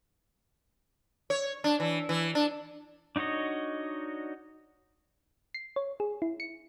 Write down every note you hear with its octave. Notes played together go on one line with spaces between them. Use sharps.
C#5
D4
E3
E3
D4
D4 D#4 F#4 C#5 D#5
C7
C#5
G#4
E4
C#7